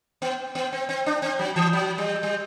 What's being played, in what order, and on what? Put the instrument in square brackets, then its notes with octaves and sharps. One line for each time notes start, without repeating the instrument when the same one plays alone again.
[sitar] B3
B3
C4
C4
D4
C4
F#3
E3
F#3
G3
G3